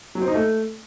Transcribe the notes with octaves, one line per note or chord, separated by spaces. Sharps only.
F#3
C4
D#4
A3